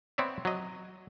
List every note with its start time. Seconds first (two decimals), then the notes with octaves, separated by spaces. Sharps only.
0.18 B3 C4 C#5 D5 E5
0.45 F#3 D#5